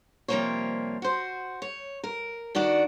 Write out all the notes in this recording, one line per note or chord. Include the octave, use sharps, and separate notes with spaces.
C3 F3 G3 A#3 C5 C#5
F#4 C5
C#5
A#4
D#3 D4 F#4 D5